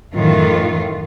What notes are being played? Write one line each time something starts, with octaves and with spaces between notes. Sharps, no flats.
F#2 A2 D#3 E3 F4